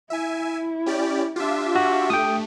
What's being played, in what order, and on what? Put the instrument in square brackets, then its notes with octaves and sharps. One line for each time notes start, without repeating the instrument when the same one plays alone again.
[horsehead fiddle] E4 [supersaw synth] E5 G#5
[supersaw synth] C#4 G4 D5
[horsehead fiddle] D4 G4 [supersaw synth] F4 E5
[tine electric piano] F#4
[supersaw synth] A3 [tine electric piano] G5 D#6